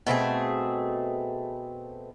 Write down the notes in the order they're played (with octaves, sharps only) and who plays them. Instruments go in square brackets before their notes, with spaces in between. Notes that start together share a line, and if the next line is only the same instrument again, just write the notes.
[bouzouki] B2 A3 C4 G#4